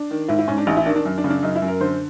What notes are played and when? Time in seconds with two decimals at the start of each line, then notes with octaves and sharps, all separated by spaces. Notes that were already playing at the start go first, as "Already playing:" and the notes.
Already playing: D4
0.11 D#3
0.28 G#2 E4
0.39 E4
0.48 G#2 C#4
0.58 D4
0.67 A1 D#4
0.77 E4
0.86 D#3 D4
0.96 D4
1.05 F#2
1.18 D4
1.24 C#3
1.30 D4
1.43 F#2 D#4
1.55 E4
1.62 F#2
1.68 A#4
1.80 D3 C5